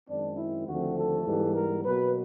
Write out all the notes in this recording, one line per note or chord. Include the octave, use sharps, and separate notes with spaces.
F#2 D#3 G#3 C4 D4
E4
D#2 D3 F3 A3 C4 F#4
A4
G#2 E3 G3 B3
A#4
B2 F#3 A#3 B4